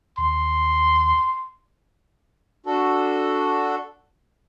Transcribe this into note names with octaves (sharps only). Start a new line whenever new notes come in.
D#2 C6
D4 F#4 A4